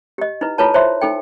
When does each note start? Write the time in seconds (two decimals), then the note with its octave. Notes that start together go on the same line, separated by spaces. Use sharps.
0.18 G4 D#5
0.41 D#4 E4 B4
0.58 E4 F4 A4 B4 C#5 A5
0.74 C5 C#5 E5 C6
1.01 D#4 A4 G5